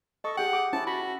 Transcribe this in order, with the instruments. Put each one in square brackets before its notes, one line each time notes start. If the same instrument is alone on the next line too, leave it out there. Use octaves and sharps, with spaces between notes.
[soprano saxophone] A4 [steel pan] D#5 C#6
[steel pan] G4 G#4 G5 [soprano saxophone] F#5
[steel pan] D6
[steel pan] C#4 E4 C5 [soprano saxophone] A5
[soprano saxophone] F#4 [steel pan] B5